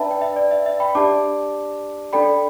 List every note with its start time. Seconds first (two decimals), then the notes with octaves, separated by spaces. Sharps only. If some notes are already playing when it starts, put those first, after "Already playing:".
Already playing: D4 B4 D5 E5 G5 A5 B5
0.11 G5
0.21 E5
0.36 D5
0.51 E5
0.66 E5
0.80 G5 B5
0.95 D4 G4 D5 A5 D6
2.13 D4 A4 D5 G5 B5